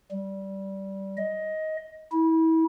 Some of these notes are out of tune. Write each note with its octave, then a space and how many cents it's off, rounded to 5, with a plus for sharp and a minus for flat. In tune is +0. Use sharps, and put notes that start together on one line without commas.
G3 -15
D#5 +15
E4 -30